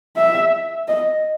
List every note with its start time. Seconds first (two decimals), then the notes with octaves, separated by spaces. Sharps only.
0.17 E5
0.88 D#5